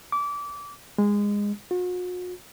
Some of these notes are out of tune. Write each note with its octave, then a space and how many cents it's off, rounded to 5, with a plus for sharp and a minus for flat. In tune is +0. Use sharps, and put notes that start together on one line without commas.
D6 -25
G#3 -20
F#4 -45